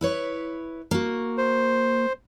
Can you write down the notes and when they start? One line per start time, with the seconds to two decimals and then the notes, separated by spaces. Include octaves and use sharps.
0.01 E4 B4 C#5
0.91 A#3 F#4
1.38 C5